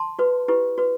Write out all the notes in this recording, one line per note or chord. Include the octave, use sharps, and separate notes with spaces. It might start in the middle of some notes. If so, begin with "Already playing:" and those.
Already playing: A5 C6
F#4 B4
E4 G4 B4
F#4 B4